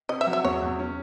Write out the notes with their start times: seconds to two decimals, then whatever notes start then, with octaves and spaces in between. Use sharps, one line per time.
0.09 C3 D#5
0.21 E5
0.27 F#3
0.33 E5
0.44 E2 C#5
0.61 E2
0.79 C#4